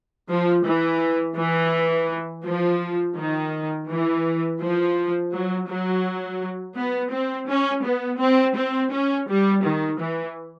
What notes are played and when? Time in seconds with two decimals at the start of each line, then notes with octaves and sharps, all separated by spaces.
0.29 F3
0.65 E3
1.37 E3
2.46 F3
3.17 D#3
3.89 E3
4.61 F3
5.32 F#3
5.68 F#3
6.76 B3
7.12 C4
7.48 C#4
7.85 B3
8.20 C4
8.56 C4
8.93 C#4
9.28 G3
9.64 D#3
10.00 E3